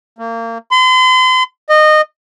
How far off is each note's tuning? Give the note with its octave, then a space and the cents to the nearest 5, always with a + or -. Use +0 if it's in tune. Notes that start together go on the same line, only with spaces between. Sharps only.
A#3 -30
C6 -40
D#5 -20